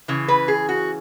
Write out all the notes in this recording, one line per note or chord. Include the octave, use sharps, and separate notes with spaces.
C#3 E3
B4
G#4
F#4